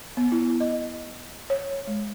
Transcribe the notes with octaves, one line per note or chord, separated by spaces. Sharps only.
B3
E4
D#5
C#5
G#3